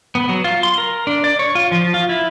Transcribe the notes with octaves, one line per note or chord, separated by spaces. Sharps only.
B3
F#3
F4
C6
A#4
D4
D5
C#5
F4
F3
F4
E4